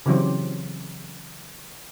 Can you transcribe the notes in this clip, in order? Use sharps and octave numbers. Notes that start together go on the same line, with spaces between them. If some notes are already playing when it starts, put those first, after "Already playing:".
C#3 E3 F#3 C4 G4